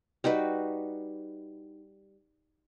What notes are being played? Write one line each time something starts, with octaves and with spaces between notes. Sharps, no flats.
G3 D#4 F#4 B4